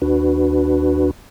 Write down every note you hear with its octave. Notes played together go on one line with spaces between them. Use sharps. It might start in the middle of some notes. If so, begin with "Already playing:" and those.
D#2 D4 F#4 B4